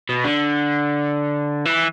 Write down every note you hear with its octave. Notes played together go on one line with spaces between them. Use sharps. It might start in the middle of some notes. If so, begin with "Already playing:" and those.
B2
D3
E3